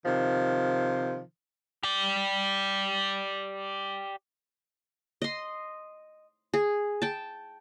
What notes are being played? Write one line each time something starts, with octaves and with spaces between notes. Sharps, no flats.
C3 D#3 F3
G4 D5
D#5 C6
G#4
G5 A5